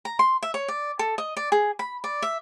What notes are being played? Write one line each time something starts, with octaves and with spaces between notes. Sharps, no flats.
A#5
C6
E5
C#5
D5
A4
D#5
D5
G#4
B5
D5
E5